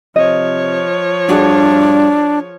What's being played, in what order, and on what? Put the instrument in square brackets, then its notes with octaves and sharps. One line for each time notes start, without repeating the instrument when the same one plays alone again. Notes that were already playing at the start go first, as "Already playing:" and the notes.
[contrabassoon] C3 [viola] F3 C#5 [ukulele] D#5
[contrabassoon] G2 [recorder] D4 [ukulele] F#4 G#4 A4